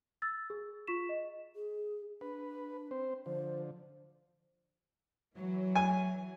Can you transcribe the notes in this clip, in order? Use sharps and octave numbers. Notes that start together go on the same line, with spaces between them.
E6 A6
G#4
F4 C#6 B6 E7
D#5
G#4
D4 B4
C4 C5
D3 F3 C5
E3 F#3
G#5